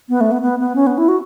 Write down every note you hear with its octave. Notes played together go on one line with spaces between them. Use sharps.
B3
A3
B3
B3
B3
C#4
B3
E4
F#4